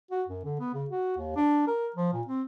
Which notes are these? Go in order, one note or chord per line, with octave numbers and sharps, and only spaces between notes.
F#4
F#2
D3
B3
C#3
F#4
D#2
D4
A#4
F3
A#2
C4